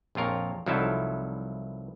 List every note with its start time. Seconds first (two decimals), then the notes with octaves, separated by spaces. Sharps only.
0.15 A#1 F2 F4 A#4 C#5
0.66 C2 F3 F#3 D#4 E4 A4